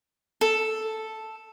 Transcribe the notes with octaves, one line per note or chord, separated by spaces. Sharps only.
A4